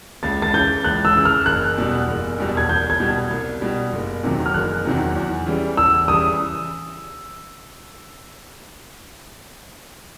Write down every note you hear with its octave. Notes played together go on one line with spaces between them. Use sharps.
C#2 A6
A6
C#3 E3 G6
C#2 F#6
E6
C#3 E3
F6
F#1 F#6
E2 B2 G3
F#1
E2 B2 G3
G#6
C2 G6
G#6
B2 G3
G#6
C2
B2 G3
F#1
E2 C3 D#3 F#3
F6
F#1 F#6
E2 C3 D#3 F#3
E2
C#3 E3 G3
E2 E6
C#3 E3 G3 D#6